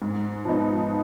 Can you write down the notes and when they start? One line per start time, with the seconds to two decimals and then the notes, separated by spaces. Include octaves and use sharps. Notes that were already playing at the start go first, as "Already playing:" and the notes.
0.02 G#2
0.45 F3 B3 D#4